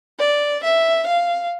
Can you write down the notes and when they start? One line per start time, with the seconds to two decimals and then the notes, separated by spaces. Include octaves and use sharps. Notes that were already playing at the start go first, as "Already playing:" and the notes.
0.19 D5
0.63 E5
1.07 F5